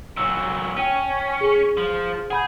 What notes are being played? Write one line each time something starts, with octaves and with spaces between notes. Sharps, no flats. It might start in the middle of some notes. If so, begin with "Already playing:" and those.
A#2 F#3 E6
C#4 G5 D#7
G#4
F3
G#4 F#5 B5 G6